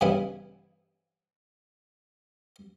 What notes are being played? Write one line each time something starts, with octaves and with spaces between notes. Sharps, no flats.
G2 C#3 E3 B3 D#4 E4